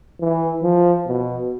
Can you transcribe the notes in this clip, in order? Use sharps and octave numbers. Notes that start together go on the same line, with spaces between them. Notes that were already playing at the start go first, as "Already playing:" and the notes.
E3
F3
B2